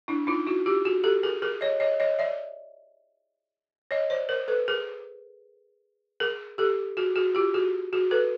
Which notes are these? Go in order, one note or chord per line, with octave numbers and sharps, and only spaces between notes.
D4 E4
D#4 F4
E4 F#4
F4 G4
F#4 G#4
G4 A4
G#4 A#4
G#4 A#4
C#5 D#5
C#5 D#5
C#5 D#5
D5 E5
C#5 D#5
C5 D5
A#4 C5
A4 B4
G#4 A#4
G#4 A#4
G4 A4
F#4 G#4
F#4 G#4
F4 G4
F#4 G#4
F#4 G#4
A4 B4